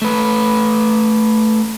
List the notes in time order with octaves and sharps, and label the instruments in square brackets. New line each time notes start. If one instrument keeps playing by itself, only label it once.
[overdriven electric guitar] A3 B4